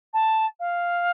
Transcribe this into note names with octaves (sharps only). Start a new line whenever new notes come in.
A5
F5